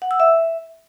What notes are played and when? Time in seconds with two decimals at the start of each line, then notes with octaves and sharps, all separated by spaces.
0.02 F#5
0.11 E6
0.20 E5